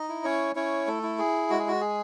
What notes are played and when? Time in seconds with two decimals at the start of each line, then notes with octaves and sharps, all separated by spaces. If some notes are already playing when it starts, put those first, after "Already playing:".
Already playing: D#4 D#5
0.09 E4
0.24 C#4 C#5
0.55 C#4 E4 C#5
0.87 A3 A4
1.03 E4
1.18 G#4
1.50 G#3 F#4
1.59 G#4
1.68 F#4
1.81 G#4